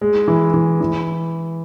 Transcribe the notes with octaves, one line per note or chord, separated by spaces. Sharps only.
G#3
E3
E3
E3